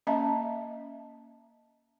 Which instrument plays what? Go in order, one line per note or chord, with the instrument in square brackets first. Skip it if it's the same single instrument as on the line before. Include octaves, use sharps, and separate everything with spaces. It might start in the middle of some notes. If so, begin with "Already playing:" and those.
[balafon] A#3 C#4 D#5 E5 A5 A#5